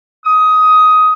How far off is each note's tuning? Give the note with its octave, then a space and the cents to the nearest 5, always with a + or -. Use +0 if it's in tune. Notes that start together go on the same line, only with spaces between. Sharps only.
D#6 +15